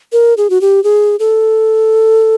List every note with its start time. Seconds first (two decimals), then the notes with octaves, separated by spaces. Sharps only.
0.13 A#4
0.37 G#4
0.50 F#4
0.61 G4
0.84 G#4
1.19 A4